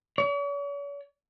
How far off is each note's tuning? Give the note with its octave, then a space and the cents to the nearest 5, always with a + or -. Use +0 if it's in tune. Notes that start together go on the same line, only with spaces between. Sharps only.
C#5 +45